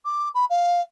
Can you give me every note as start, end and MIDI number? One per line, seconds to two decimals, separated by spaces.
0.05 0.29 86
0.35 0.45 83
0.50 0.81 77